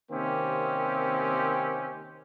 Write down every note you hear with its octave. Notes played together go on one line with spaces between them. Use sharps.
C3 D#3 A#3 C4 C#4 G4